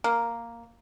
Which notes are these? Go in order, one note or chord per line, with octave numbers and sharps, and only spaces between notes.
A#3